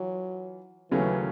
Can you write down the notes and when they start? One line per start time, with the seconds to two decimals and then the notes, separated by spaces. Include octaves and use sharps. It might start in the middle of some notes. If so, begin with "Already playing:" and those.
Already playing: E3 F#3 F4
0.91 D#2 C#3 E3 F#3 A3 C#4